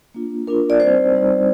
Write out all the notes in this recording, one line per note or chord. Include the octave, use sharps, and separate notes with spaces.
A#3 D4 F4
A#3 D4 F4 A#4
D5
G3 C4 D#4 C5
G3 C4 D#4